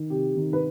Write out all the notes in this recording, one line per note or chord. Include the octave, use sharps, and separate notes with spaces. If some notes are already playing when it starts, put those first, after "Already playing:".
Already playing: D#3
C3 G4
D#3
B4